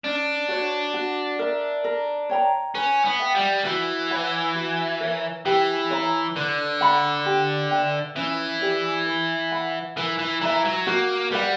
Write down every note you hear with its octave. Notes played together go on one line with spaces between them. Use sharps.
C#4 D4
F#4 C#5
F#4
A#4 E5
A#4
C#5 G5 A#5
C#4 B4
B3
E5 G5
G3
E3 F#4
C#5 F#5 B5
F#4
A#4 C#5
E3 G4
C#5 E5 A#5
D3 B4
F#5 B5
G4
B4 E5 G5
E3 C#4
G4 B4 D5
B4
F#5 B5
E3 A#4
E3
E3 E5 A#5
F#3
A#3 F#4
G3 B4 F#5